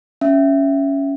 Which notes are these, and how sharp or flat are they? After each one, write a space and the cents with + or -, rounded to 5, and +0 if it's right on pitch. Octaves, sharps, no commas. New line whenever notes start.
C#4 +5 E5 +10